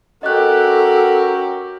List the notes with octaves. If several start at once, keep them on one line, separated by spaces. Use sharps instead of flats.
C#4 F#4 G4 A4 A#4 D#5 F#6